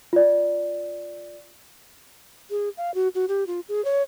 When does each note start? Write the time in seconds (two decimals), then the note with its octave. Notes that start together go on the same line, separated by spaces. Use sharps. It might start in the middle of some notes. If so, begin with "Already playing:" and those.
0.13 F4 D5
2.51 G#4
2.77 F5
2.95 F#4
3.15 F#4
3.28 G4
3.47 F4
3.69 G#4
3.85 C#5